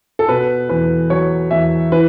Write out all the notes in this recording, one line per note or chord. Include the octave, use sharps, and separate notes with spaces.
A4
B2 B4
E2 B4
F#3 C#5
E2 E5
E3 B4